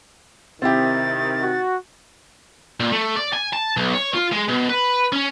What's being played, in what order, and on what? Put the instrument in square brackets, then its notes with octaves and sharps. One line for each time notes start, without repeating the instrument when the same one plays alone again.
[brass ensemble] C3 D#3 [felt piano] C4 E4 G4 [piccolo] A6
[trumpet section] F#4
[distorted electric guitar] A#2
A3
D5
G#5
A5
B1
C#5
F4
G#3
B2
B4
C#4